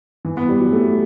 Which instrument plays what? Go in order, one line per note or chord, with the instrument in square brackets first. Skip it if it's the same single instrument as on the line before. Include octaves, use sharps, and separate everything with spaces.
[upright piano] E3
B3
G3
F#3
A3